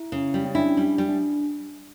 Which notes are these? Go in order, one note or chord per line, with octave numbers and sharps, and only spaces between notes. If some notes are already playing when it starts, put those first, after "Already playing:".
Already playing: E4
C#3
G3
C#4
D4 E4
G3
G3
D4